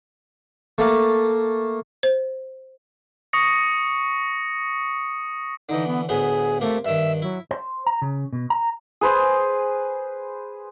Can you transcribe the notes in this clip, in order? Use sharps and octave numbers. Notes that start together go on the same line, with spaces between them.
A3 A#3
C5
C#6 D#6 A#6 C#7
D3 E3 D#4
B3
D2 A2 B3 G#4
C3 A3 A#3
G2 D#3 E5
F#3 E4
C5
A#5
C#3
B2
A#5
G#4 B4 C5